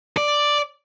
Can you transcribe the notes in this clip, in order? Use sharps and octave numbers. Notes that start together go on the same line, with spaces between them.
D5